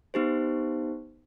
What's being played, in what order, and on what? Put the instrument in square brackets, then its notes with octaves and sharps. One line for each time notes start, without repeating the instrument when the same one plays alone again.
[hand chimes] B3 D#4 G4 C5